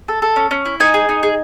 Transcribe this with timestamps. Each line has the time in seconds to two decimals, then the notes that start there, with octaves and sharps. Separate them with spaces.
0.08 A4
0.22 A4
0.36 C#4
0.51 C#4
0.66 E4
0.80 D#4 G#5
0.94 G#4
1.09 D#4
1.23 G#4